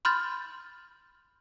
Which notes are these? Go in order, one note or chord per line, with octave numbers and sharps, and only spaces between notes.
B5 C6 F6 G6 A6